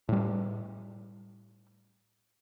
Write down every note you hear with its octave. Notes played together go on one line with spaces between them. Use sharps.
A2 G3